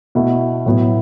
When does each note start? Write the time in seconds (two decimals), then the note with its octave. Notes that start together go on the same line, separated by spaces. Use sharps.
0.15 B2 A3 E4
0.66 A2 F#3 B3 E4